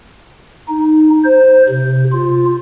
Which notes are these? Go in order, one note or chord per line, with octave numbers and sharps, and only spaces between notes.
D#4
C5
C3
F4